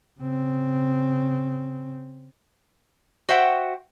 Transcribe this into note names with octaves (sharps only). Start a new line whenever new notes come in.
C#3 C4
F#4 C5 E5 F#5 G5